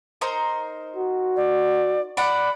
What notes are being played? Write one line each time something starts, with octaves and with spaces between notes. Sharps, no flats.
D#4 A#4 C5
F#4
D5
D5 F#5 B5